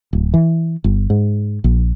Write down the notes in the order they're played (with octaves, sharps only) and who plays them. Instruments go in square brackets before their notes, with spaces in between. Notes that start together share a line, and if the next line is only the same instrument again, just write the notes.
[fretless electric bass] D1
E3
G1
G#2
A#1